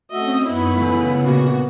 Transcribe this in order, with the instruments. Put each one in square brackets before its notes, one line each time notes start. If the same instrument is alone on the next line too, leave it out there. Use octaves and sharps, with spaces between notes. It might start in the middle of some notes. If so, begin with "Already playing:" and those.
[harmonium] A3 F#4 E5 [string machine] C4 C#4 [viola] D#5
[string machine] F#2 D#4 C#6 [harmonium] B3 [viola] E4 B4
[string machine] C#3 [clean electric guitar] E3 A3
[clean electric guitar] C2 A#2 A#3 [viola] F#4